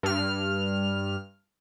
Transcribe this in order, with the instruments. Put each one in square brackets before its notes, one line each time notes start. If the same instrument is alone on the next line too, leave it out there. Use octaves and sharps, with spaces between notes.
[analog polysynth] G2 F6